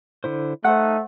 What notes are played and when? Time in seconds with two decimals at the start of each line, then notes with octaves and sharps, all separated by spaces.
0.24 D3 E4 C5
0.64 A3 D#4 C5 F#5 F#6